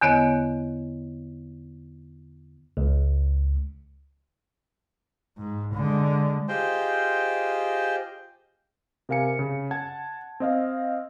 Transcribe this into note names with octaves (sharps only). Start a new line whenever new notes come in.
E2 D3 B3 C#5 D#5 F#6
C#2
G#2
D3 G#3
F4 G4 G#4 C5 D#5 G5
C3 A#4 F5 G#5 C#7
C#3
F#5 A5 G#6
C4 D#5 F5